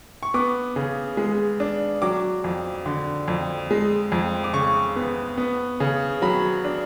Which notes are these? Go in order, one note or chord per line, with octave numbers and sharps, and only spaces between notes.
C#6
B3 D6
C#3
G#3
D4
F#3 D6
F2
D3
F2
G#3
F2
D6
C#3 C#6
B3
B3
C#3
F#3 B5
D4